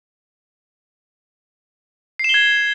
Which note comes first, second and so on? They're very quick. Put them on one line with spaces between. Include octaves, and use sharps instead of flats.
C7 E7 G7 G#6